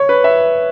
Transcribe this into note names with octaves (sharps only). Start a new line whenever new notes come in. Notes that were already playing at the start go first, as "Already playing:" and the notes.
Already playing: C#5 C#6
B4
E5